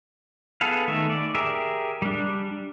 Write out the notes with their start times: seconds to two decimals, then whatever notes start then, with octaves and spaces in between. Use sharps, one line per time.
0.61 B3 G#4 A4 B4 F5
0.87 D#3 A3 E5
1.10 D5
1.35 G4 G#4 A#4 E5
2.02 G3 D4